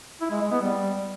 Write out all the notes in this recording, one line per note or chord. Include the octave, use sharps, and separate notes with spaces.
E4
G#3
G#3
B3
G3